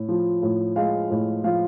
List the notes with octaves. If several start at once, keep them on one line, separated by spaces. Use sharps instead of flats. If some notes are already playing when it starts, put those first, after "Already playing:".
Already playing: A2
F3
A2
G#3 F5
A2
F3 F5